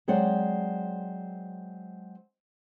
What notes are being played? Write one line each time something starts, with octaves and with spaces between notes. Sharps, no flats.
F#3 G#3 C4 C5 D5 F#5